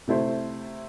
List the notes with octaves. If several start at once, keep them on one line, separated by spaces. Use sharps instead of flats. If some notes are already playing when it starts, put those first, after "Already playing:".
C3 A3 E4 C5